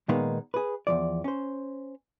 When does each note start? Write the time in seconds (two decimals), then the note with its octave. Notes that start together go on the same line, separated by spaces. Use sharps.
0.09 A#2 D#3 G#3 A#3 B3 D#4
0.54 G#4 B4
0.87 E2 F3 D5
1.24 C#4 C5